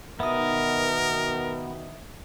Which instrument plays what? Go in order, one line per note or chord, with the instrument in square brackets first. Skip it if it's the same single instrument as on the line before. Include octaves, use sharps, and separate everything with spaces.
[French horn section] B2 D#3 [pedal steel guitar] B3 [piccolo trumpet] A#4 [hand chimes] E5 D#6